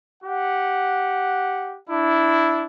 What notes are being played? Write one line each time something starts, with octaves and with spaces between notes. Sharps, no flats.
G4 F#5
D4 E4